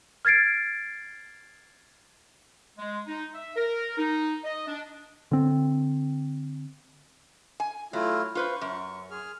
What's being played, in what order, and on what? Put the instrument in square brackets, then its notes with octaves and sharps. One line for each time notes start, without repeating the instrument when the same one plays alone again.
[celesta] F6 G#6 A6 C7 D7
[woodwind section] G#3
D#4
E5
A#4
D#4
D#5
D4
[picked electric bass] D3 C4
[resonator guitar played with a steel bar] G#5
[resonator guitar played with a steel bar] F#3 [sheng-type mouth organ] A3 E4 F4
[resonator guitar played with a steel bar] F4 B4 C5 [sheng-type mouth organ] C#6
[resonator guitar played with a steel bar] F#2
[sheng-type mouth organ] G#4 F6